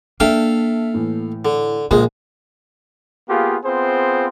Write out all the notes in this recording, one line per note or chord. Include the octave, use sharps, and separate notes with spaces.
A#3 D4 A4 E5 F5 G5
A2 E3
D3
A#1 F3 G#3 A#3 G#4
A#3 B3 F4 G4 G#4
B3 C4 F4 G#4 C5